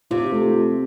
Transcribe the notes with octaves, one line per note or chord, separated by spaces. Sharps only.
C3 F4
A3